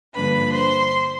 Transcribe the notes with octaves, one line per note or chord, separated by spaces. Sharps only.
G2 D3 F3 A#3 D4 B4 B5
C5 C6